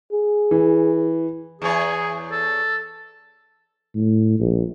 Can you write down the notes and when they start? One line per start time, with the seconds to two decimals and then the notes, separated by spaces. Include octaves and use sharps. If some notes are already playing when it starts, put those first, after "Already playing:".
0.13 G#4
0.51 E3
1.62 E2 G#4 C#5
2.32 A4
3.95 A2
4.40 A#1